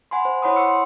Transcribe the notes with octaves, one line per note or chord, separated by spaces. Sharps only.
F#5 G#5 B5 C6
C5
E4 C#5 F#5 B5 C6 D#6
F#5 C#6 E6 C#7
C6